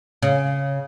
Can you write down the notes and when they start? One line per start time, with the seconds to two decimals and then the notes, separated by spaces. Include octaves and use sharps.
0.23 C#3